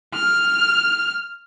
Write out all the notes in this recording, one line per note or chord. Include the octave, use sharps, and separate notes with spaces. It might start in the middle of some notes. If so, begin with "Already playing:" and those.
F6